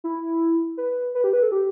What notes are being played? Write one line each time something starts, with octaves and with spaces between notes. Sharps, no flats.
E4
B4
B4
G4
B4
A4
G4